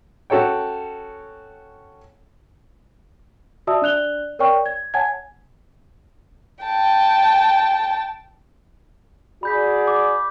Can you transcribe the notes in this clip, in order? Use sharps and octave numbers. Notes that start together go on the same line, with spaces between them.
C#4 F#4 A4 C#5 G5
F#4 D5 E5 A5 D#6 E6
D4 D5 F#6 F7 G7
A#4 C#5 D5 G5 C#6 F6
G#6
C#5 F#5 G#5 A5 G#6
G5 A5
F#4 G#4 D5 B5 G6 B6
D6